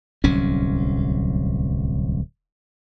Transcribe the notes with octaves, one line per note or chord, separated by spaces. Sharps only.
D1 C2 F#3 C#4